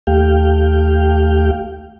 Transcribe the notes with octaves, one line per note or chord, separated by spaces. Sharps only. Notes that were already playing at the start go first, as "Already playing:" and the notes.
D#2 A3 G4 F5 G5